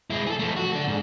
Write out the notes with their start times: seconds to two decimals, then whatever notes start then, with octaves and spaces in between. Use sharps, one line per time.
0.10 G#3 E4
0.27 G#4 A4
0.39 F3 A3
0.57 F#4
0.73 D4 A4
0.88 G#2